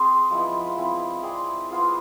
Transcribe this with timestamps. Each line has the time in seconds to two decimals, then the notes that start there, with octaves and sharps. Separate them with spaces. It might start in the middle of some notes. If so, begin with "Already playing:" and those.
Already playing: C4 G#4 C5
0.31 F3 G#3 B3 E4
0.77 G#3 C4 E4
1.23 C4 G#4 D5
1.69 B3 F4 G#4 C5